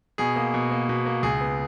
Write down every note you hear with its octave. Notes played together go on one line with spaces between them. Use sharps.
B2 G#4
A#3
B2
A#3
B2
A#3
C#2 G#4
B3